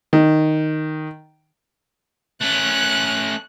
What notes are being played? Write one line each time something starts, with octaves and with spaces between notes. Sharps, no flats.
D#3
A3 C#4 F#6